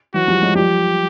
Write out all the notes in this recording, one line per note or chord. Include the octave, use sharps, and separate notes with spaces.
E3 F#3 F#4
F3 G3
F#3 G#3
F3 G3 G4